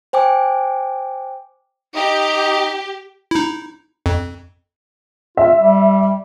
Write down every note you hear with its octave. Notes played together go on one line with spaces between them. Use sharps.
C5 G5 G#5 D6
D#4 G4
D#4 E4
F2
F4 E5
G3